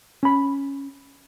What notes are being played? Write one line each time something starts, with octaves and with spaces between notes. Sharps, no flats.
C#4 B5